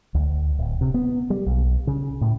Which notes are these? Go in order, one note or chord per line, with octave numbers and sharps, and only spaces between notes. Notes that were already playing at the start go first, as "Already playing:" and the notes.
D2
D1
C3
B3
G3
B1
C#3
A2